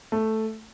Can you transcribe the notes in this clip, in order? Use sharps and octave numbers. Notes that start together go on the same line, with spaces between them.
A3